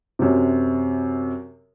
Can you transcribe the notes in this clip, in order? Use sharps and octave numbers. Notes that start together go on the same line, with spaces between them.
F#2 C3